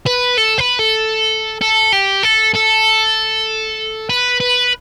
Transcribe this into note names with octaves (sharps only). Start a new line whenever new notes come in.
B4
A4
B4
A4
A4
G4
A4
A4
B4
B4